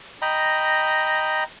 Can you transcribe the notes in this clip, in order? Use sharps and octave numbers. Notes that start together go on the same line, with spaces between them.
D#5 G5 A#5 B5